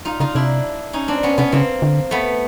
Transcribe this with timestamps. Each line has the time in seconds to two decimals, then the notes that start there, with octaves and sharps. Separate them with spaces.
0.05 D#4 F4
0.20 C#3 D#4 F4
0.35 C3 D4 E4
0.93 C#4 D#4
1.08 C4 D4
1.23 B3 C#4
1.38 C3 B3 C#4
1.52 C#3 A#3 C4
1.82 D3
2.11 A3 B3